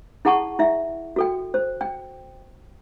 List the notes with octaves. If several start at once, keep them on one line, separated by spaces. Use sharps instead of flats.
E4 G#4 F#5 A5 C#6
E4 E5
F#4 A4 G5
C5
G5